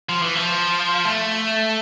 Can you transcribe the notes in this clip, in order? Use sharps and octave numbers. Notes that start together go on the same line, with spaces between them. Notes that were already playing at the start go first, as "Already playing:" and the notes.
F3
E3
F3
A3